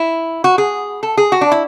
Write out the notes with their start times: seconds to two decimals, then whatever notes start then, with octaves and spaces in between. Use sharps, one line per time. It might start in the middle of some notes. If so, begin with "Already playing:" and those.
Already playing: E4
0.44 F#4
0.58 G#4
1.03 A4
1.17 G#4
1.32 F#4
1.41 D4
1.52 E4